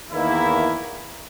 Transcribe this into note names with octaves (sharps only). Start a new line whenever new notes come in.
E2 D#3 A#3 E4